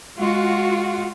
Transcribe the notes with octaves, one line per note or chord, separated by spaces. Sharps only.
G#3 F4 F#4